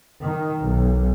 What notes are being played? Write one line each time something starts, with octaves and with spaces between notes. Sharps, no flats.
D#3
B1